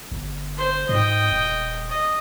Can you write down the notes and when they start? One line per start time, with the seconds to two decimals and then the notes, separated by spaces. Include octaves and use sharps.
0.11 G1
0.58 C5 C6
0.89 G#2 D#5 G5
1.31 D#1
1.89 D#5